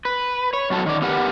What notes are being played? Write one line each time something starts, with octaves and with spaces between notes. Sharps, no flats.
B4
C#5
F#2 B2 F#3 A4 A5
D#3 D5
B3 G4 A#4 B4 F#5